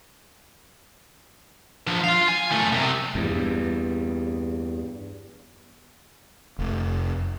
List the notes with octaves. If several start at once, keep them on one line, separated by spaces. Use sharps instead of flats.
F3 D4
F4 F5
G#5
F#2 A3
C2 C3
E2 G2
F1